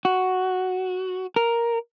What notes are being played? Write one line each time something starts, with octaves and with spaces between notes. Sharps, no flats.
F#4
A#4